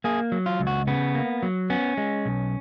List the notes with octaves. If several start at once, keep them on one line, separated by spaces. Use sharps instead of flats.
A#3 G#4
F#3
F4
C#2
F#4
C#3 B3
A#3
F#3
B3 C#4
G#3
B1